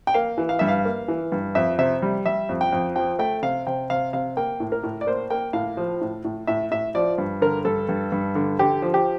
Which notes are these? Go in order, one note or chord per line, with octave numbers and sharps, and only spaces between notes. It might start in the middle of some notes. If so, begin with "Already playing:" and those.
G5
A#3 F5
E3
F5
G2 E5
F5
A#3
E3
G2
F2 E5
C3 E5
G3
G3 E5
F2
G5
F2
F3 G5
A3 G5
C3 F5
C3 G5
C3 F5
C3 F5
A#3 G5
A2
A#4
A2
D5
A#3 C5
A#3 G5
A2 F5
F3
A2
A2
A2 E5
A2 E5
F3 D5
G2
D3 A#4
G2 A4
G2
G2
D3
D3 G4
F3
G4